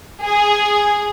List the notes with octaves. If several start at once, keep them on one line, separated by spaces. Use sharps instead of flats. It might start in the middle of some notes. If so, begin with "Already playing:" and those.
G#4